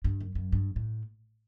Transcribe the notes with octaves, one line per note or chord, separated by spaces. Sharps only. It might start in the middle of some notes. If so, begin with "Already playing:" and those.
G2
F#2
F#2
G2
A2